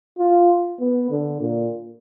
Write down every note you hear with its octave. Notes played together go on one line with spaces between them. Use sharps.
F4
B3
D3
A#2